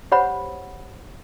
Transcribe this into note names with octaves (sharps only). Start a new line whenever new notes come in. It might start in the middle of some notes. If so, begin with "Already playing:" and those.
G4 C5 C#5 F#5 B5